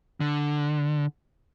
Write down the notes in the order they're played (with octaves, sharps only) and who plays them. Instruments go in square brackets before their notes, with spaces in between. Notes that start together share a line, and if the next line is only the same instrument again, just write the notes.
[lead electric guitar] D3